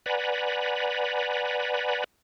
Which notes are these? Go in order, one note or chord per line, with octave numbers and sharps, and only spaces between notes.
B4 D5 F#5 G#5 A#5 B5